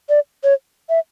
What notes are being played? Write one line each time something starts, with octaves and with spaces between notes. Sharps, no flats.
D5
C#5
E5